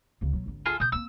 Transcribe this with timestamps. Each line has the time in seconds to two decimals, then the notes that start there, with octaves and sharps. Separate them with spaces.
0.21 C#2 C#3
0.33 B2 F#3
0.46 G#1 D2
0.66 F4 G#4 A4
0.80 B2 D#6 G6
0.92 A#3 C4 E6